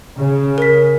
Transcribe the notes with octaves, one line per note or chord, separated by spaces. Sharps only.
C#3
A#4 B6